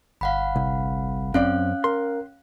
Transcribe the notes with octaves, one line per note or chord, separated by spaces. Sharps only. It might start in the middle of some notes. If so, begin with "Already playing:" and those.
G1 F5 F#5 B5
C2
F#2 C4 C#4 D5 F5 F#6
A#4 C6